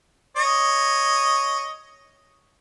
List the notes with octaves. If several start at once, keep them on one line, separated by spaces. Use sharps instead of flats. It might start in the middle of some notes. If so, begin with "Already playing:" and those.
C#5 D#5